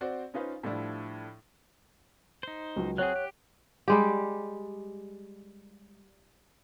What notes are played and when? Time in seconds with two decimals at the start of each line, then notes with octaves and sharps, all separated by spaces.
0.01 C4 F#4 C5 D5
0.34 C#4 D#4 F4 B4 C5
0.63 A2 F3 G3 D4 E4
2.43 D#4 C5
2.76 C#2 F#3
2.98 F#3 C4 G#4 C#5 F#5 F#6
3.16 G4
3.88 G3 G#3 G4